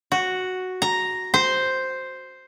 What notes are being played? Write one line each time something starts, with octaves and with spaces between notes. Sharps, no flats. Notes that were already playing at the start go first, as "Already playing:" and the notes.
F#4
A#5
C5